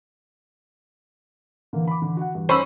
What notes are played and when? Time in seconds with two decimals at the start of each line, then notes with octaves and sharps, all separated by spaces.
1.73 D3 E3 A#3
1.88 B5 D6
2.02 D3
2.17 F#4 F#5
2.35 G2
2.49 C#4 C5 B5 E6